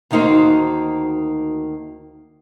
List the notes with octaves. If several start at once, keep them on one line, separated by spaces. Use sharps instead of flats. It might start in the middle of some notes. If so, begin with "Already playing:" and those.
D2 D#3 A#3 D#4 F#4 C5